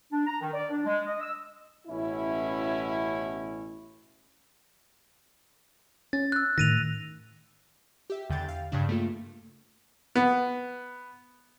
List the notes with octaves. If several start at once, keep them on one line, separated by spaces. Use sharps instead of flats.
D4
A#5
D#3
D5
D4
G#3
D#5
E6
A1 B2 C#4 E4
C#4 A6
E6 F#6
A2 D#3 A#6 D#7 F7
G4 E5
E2 D3 G5 G6 A6
F5
G2 C#3 D4
A3 A#3 F4
B3